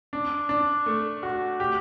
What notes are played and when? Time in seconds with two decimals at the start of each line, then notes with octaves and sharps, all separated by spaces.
0.13 D4
0.49 D4
0.86 A3
1.23 F#4
1.60 G4